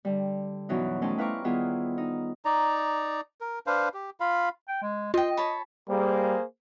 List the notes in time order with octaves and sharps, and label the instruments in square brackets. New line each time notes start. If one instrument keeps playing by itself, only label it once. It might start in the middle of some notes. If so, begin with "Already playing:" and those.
[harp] D3 G3
F#2 B2 E3 F#3 D#4
A3 C#4 D#4 C5 G5 A5
E4 B4 F5 A#5 C#6 D6
D#3 G3 B3 E4 F4 G#4
D#4
[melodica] D#4 D5 A#5
A#4
D4 B4 C5 F5
G4
F4 F5 B5
[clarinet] G5
G#3
[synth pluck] F4 [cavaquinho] C5 G5 [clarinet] D#5
[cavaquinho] C#5 A5 B5
[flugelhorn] G3 [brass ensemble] A#3 G#4 C5